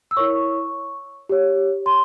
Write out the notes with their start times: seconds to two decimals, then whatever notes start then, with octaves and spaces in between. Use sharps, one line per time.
0.11 E6
0.17 E4 A#4 C#5 C#6
1.29 G4 C#5
1.86 C6